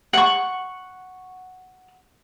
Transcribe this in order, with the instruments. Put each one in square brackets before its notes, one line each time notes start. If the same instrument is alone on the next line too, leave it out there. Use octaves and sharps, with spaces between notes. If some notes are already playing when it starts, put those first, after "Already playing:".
[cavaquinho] F#5 C#6